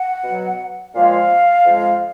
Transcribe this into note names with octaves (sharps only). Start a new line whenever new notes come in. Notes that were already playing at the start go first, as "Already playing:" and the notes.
Already playing: F#5
B2 F#3
A#2 F3 G#3 F5
F2 F3 G#3